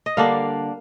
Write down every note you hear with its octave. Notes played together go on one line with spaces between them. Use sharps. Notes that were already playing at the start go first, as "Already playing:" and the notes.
D#5
D3 G3 A#3 D4 F5